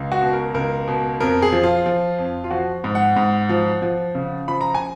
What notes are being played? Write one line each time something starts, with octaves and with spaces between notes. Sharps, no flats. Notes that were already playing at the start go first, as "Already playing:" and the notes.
Already playing: C#2
F#4
B2
A#4
C#2 A#4
B2
F2 A#4
G#4
F3
F4
F3
F2
F4
F3 F#4
G#2
F#5
G#2
F3
F3
C#3
F3 B5
A#5
G#5